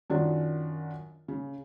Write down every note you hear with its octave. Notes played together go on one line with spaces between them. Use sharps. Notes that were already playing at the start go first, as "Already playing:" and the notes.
F#2 D#3 D4 F4 F#4
C#3